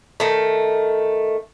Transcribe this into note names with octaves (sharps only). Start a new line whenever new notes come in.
D#3 A3